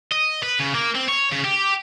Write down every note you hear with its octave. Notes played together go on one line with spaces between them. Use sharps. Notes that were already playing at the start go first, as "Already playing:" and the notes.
D#5
B4
C#3
A#3
C4
C#5
C#3
G4